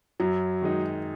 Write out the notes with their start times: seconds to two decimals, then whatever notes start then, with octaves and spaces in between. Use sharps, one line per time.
0.20 F#2 F#3
0.62 D#3 G#3 D#4